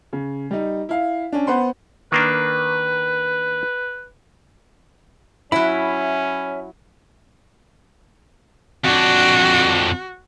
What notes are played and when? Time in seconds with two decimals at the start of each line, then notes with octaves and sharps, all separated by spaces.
0.13 C#3
0.51 G3 D#4
0.89 E4 F5
1.32 C#4 D4
1.47 B3 C5 F#5 B5 C6
2.12 D#3 A#3 D4 B4
5.52 F#3 C#4 E4 C#5 E5 B5
8.84 F2 D4 F#4